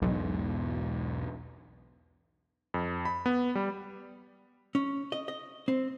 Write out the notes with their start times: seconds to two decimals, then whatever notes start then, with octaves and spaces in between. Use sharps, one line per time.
0.02 B1 E2 G#2 B2
2.74 F2
3.05 B5
3.26 B3
3.55 G3
4.75 C#4
5.12 D#5
5.28 D#5
5.68 C4